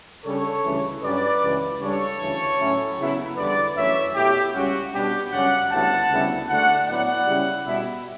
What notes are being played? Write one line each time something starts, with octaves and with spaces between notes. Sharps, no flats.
C#3 G3 D4 A4 C#5
D2 C#3 E3 G3
G2 F#3 C#4 B4 D5
C#2 C#3 E3
C#2 C#3 G3 D4 A4 C#5
D2 C#3 E3
A2 F#3 C#4 E4
C#3 F#3 B3 E4
E2 D3 G3 B4 D5
F#2 E3 A3 C#5 E5
B2 A3 E4 G4
C#2 C#3 G3 C#4 F#4
B2 G3 B3 D4 G4
F#2 C#3 G3 C#4 D5 F#5
D2 C#3 G3 B3 E4 F#5 A5
D2 C#3 G3 B3 E4
D2 D3 A3 D5 F#5
A2 F#3 B3 E4 D5 F#5
C#3 G3 C#4 E4
B2 G3 B3 E4